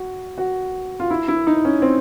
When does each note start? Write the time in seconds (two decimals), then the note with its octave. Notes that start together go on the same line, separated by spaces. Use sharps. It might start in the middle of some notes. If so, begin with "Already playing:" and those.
Already playing: F#4
0.38 F#4
1.00 F4
1.11 E4
1.28 E4
1.47 D#4
1.65 C#4
1.82 C4